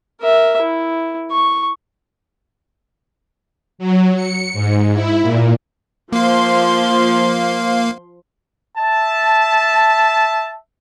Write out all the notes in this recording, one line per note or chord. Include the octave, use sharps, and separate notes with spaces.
A#4 E5
E4
C#6
F#3
C#7
G#2
E4
A#2
F3 A#3 F5 C6
E5 A5